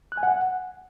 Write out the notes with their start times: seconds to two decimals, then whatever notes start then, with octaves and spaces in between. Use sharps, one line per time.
0.12 F#6
0.17 G#5
0.23 F#5